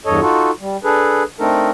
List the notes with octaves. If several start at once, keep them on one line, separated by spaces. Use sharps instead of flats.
E2 G2 A4 C#5 D#5
D#4 F4 F#4 A4
G3
D4 G#4 A4 B4
A3 C4 D4 D#4 A4 A#4